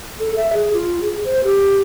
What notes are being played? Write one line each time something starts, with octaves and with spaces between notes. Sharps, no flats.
A4
E5
G#4
F4
G#4
C5
G4